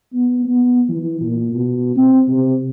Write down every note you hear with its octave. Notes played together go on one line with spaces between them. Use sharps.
B3
B3
E3
A#2
B2
C4
C3